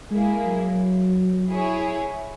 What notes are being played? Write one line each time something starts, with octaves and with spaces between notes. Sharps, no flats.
G#3 A#3 E4 G#4
F#3
E4 G#4 C#5